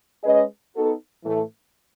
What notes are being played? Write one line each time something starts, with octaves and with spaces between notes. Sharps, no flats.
G#3 C#4 G#4 B4 D#5
B3 D#4 F#4 A4
A2 E3 A3